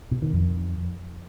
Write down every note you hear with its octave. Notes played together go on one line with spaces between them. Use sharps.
B2
D#3
F2